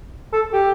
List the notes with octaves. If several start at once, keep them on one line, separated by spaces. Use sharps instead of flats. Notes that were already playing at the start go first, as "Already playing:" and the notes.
A4
G4